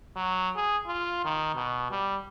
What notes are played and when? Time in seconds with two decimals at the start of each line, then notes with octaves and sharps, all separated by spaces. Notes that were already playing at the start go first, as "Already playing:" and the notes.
0.16 F#3
0.56 G#4
0.87 F4
1.25 D#3
1.55 B2
1.91 G3